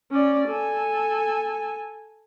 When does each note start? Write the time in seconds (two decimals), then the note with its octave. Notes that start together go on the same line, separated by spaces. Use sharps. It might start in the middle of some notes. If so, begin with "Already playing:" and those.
0.11 C#4 D5
0.48 A4 G#5